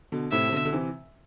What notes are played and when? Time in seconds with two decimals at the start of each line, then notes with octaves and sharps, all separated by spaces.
0.12 B2 D3
0.32 A2 C3 E5
0.48 C3
0.52 B2 D3
0.65 D3
0.73 C3 E3